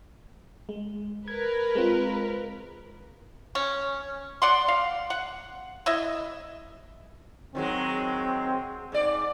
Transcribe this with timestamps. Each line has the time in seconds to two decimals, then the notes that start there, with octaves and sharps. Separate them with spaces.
0.69 G#3
1.28 A#4 B4 G#6
1.75 G#3 C4 F4
3.55 C#4
4.42 D5 F#5 C6
4.68 F5
5.10 F#5
5.86 E4 D#5 E5
7.55 D#3 F#3 G#3 C4
8.92 G#2 D5